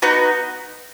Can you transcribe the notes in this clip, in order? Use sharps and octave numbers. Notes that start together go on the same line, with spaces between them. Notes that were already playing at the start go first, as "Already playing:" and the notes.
B3 D#4 F#4